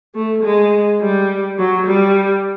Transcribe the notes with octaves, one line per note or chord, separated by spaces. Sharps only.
A3
G#3
G3
F#3
G3